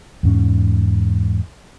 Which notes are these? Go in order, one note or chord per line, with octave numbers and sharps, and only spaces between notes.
E2 G#2 C#4